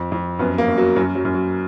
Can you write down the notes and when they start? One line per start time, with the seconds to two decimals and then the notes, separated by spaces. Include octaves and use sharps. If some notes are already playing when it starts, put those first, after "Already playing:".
Already playing: F2
0.12 F2
0.39 F#2 B3
0.58 A#3
0.68 F#2
0.78 F#3
0.96 F#2 F#3
1.15 F#3
1.25 F#2
1.34 F#3